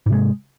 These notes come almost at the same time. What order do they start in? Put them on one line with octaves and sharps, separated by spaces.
G#2 C3 G#3